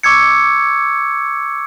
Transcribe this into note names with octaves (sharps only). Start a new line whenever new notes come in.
C#6 D6 E6 G#6 C#7